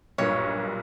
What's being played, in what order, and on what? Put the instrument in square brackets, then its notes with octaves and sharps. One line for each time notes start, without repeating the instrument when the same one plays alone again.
[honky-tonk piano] B1 G2 A#2 [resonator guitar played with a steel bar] C#5